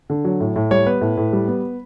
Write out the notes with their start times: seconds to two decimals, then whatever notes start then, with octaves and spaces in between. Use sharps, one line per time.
0.10 D3
0.25 F#3
0.40 A2
0.56 A2
0.71 G3 C#5
0.86 B3 B4
1.01 A2
1.17 A2
1.33 G3
1.48 B3